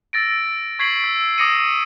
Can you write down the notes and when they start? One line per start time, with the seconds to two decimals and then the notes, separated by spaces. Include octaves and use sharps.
0.13 E6 A6 A#6 D7
0.79 C#6 G#6 B6 C7 D7 F#7
1.00 E6 B6
1.38 D6 D#6 A#6 C#7 D#7